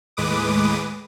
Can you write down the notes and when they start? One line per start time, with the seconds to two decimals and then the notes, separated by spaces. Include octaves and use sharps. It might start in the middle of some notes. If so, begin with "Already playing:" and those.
0.17 D#2 A2 G#3 B4 D6 D#6